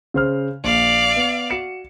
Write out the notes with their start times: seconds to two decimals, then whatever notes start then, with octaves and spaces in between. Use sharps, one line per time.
0.14 C#3 C5 F6
0.64 A#1 D5 F5
1.16 B3
1.50 F#4 C#7 E7